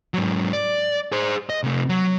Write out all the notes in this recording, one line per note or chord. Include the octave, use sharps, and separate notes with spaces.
G#2 F#3
D5
G#4 C5
D#5
C3 A3
F#3